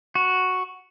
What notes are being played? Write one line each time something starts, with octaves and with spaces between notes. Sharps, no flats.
F#4